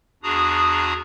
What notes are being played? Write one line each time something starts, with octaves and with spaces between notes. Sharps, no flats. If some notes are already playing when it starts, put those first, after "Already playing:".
E2 D4 F#4 G#4 A#5 D#6